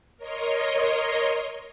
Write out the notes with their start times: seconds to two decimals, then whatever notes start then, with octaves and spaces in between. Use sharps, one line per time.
0.17 A#4 C#5 D#5 C6